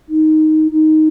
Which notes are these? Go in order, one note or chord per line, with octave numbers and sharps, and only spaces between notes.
D#4
D#4